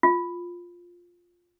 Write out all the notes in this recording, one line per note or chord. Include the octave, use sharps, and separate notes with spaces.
F4